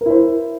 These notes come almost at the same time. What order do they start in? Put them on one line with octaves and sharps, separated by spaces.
A#4 E4 C5